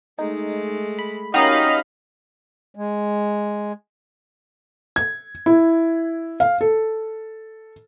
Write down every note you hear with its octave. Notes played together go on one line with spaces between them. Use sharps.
G#3 A3 D#4
B5
C#4 D#4 F#4 G4 A#4 D#5 F5 B5
G#3
G#6
E4
F5
A4